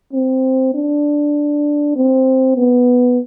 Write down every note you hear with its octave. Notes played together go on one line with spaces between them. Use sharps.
C4
D4
C4
B3